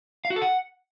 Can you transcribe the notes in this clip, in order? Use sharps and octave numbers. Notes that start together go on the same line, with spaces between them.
F5
F#4
A4
F#5